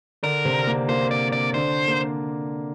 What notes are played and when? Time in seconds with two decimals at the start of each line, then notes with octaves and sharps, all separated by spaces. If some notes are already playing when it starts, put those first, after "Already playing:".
0.23 D3 D4 A#4
0.45 C3 C4
0.67 A#3
0.89 A#3 C5
1.11 D5
1.33 D5
1.54 D3 D4 C5
1.88 A#3